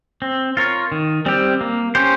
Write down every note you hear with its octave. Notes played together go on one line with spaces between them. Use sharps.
C4
F4 A#4 C#5
D#3
G3 C4 G4
A#3
C#4 G4 C5